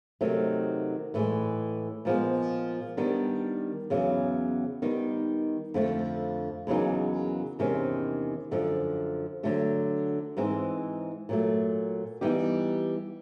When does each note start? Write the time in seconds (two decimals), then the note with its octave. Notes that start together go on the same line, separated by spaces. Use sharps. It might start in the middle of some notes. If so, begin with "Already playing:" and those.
0.21 C3 D#3 F#3 A3
1.14 A2 E3 G#3
2.05 A#2 F3 G#3 B3
2.97 D#3 G3 B3 D4
3.90 E2 C#3 F#3 B3
4.82 D#3 G3 B3 D#4
5.74 F2 D3 F3 A3
6.67 E2 C#3 F#3 A#3 D#4
7.59 E2 C3 D#3 G#3 C#4
8.51 F#2 D3 F3
9.43 D3 F#3 A3 D4
10.37 G#2 E3 G#3 C4
11.29 A#2 F#3 A3
12.21 E3 G3 B3 D#4 G4